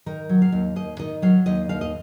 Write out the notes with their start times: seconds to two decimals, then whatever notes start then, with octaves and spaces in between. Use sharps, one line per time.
0.06 D#3 A#4
0.29 F#3
0.42 F5
0.52 D#2
0.76 D#2 D#5
0.99 D#3 D#5
1.22 F#3 F5
1.46 D#2 D#5
1.69 D#2 F5
1.81 D#5